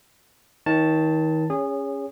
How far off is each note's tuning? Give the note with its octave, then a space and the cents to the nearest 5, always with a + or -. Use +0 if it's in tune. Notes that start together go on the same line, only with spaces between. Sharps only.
D#3 +30 C#5 +0 A5 +0
C#4 +0 G#4 -25 C#5 +20